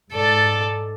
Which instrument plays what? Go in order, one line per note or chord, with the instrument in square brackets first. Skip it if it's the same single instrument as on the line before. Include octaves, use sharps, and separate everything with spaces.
[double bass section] G#2 [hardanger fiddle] A4 D5